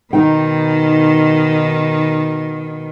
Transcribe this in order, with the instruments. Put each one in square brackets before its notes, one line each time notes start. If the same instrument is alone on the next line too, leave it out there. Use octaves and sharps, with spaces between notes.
[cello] B2 D#3 [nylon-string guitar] D#4 G5